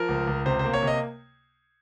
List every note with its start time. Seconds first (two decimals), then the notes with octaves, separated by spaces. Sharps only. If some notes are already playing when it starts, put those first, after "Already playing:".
Already playing: F3 A#4
0.09 C#2
0.27 C#2
0.46 C3 C5
0.59 C5
0.64 A#3
0.73 C#5
0.83 C3 D#5